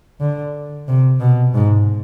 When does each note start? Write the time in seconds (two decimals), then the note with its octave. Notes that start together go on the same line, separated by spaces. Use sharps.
0.21 D3
0.88 C3
1.20 B2
1.54 G#2